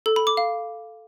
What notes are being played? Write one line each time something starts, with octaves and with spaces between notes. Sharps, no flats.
A4
B5
D6
F5